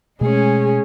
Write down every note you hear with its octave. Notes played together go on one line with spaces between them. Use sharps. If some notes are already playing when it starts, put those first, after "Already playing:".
B2 G#3 A3 C#4 G#4